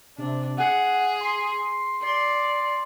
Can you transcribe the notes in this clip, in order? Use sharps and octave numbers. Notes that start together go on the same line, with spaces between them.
C3 D4
G#4 F#5
C6
D5 C6